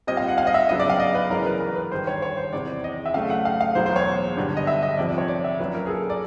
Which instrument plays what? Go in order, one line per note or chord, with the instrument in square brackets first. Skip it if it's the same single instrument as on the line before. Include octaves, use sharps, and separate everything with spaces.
[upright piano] A#2 G3 C4 D#5
F5
F#5
F5
D#5
E5
C#3 F#3 B3 D4 D#5
D5
F5
D#5
B4
F#2 C#3 E3 G#3 C#4 A#4
B4
A#4
B4
G2 D#3 G3 C5
C#5
C#5
C5
E2 C3 E3 D5
D#5
E5
C#3 F#3 A3 F5
F#5
F5
F5
E2 B2 F#3 A#3 C5
C5
C#5
G2 D3 G3 B3 D4
D#5
E5
D#5
F2 C3 F3 D5
D5
C#5
D5
E5
A#2 F#3 A#3 C#4 B4
A#4
G#4
A4
D5